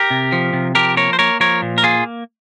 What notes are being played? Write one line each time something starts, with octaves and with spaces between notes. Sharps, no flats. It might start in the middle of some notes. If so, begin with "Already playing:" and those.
Already playing: G4 A#4
C3
F3
C3
F3 G4 A#4
A#3 A#4 C#5
C5
A#3 A#4 C#5
F3 A#4 C#5
A#2
A#4
A#3 F4 G#4